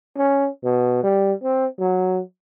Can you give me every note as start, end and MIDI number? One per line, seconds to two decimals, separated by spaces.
0.17 0.49 61
0.64 1.03 47
1.03 1.33 55
1.43 1.66 60
1.79 2.21 54